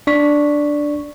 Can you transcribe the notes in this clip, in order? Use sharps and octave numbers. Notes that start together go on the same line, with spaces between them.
D4 D5 C#6 B6